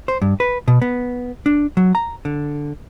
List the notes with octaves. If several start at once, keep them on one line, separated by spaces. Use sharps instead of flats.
C5
G2
B4
B2
B3
D4
F#3
A#5
D3